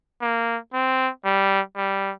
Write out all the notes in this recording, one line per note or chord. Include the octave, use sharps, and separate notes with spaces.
A#3
C4
G3
G3